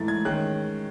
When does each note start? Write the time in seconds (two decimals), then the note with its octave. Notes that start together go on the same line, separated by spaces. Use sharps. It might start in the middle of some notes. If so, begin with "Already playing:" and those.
Already playing: G#2 E3 A3 A6
0.08 G#6
0.25 D#3 G#3 C#4 F#6